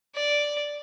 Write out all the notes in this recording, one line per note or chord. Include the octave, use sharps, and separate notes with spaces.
D5